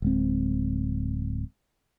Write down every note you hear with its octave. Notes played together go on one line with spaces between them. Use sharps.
D1 G#3 C4